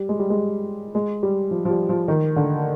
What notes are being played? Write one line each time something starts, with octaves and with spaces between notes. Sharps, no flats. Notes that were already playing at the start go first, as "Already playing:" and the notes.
Already playing: G3
G#3
G3
G#3
G#3
G3
F3
F3
G3
F3
D#3
D3